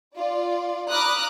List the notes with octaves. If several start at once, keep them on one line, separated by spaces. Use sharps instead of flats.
F4 D5
A#5 B5 D6 D#6 F6 F#6